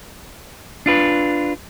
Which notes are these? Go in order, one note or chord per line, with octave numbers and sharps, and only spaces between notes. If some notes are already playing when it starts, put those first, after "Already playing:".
D4 F4 B4